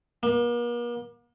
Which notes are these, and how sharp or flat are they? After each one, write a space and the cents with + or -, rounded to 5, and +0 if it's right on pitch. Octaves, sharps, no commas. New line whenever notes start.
A#3 +45